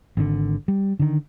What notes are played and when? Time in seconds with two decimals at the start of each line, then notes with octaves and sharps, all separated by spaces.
0.17 G#1 D3
0.68 G3
0.99 D3 D#3